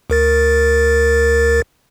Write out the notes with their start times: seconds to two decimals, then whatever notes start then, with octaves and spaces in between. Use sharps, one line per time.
0.10 D2 A#4 A6